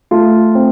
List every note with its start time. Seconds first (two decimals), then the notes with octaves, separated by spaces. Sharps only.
0.11 A3 F4
0.55 C4